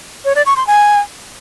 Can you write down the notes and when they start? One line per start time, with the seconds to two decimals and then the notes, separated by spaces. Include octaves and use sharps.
0.25 C#5
0.35 D5
0.46 C#6
0.56 C6
0.67 G#5